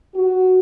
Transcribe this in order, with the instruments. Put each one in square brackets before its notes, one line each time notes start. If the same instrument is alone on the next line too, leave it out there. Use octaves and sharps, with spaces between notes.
[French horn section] F#4